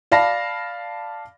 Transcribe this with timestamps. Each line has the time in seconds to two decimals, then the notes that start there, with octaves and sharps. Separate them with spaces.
0.12 D5 F5 A5 B5 A#6